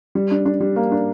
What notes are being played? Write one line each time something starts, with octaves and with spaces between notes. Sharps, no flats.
G3
D4
D4
G3
A#3
D4